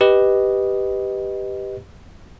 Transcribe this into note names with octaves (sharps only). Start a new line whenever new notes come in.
G4 B4 D#5